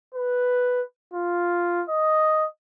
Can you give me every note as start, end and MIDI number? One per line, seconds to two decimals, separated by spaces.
0.14 0.81 71
1.13 1.83 65
1.89 2.46 75